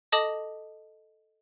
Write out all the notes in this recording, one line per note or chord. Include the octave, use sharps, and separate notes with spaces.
A4 D#5 A5 D6 D#6 A#6